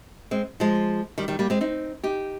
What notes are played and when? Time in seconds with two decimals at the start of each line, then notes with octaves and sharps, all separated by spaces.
0.31 G#3 C4
0.60 F3 G#3
1.18 D#3 G3
1.28 D#3 G3
1.39 G3 A#3
1.50 G#3 C4
1.61 C4 D#4
2.03 D#4 G4